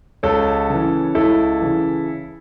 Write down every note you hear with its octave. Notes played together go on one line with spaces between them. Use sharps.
C#2 A4 C#5
C#3 E3
C#2 E4 A4
C#3 E3